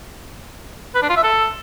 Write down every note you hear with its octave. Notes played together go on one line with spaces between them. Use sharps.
B4
D4
F4
E5
A4